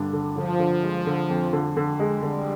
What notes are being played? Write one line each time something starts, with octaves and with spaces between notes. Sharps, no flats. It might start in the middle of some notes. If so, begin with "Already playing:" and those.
Already playing: G2 D3 D4
D3
D3 F3
D3
G#3
D3
F2
D3
D3
G#3
D3 G3